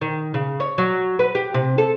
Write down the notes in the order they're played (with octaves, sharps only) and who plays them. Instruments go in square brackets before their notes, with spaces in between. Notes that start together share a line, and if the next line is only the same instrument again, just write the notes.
[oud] D#3
C#3
C#5
F#3
B4
G4
C3
A4